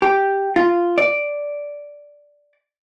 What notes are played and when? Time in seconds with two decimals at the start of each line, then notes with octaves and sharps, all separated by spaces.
0.02 G4
0.56 F4
0.98 D5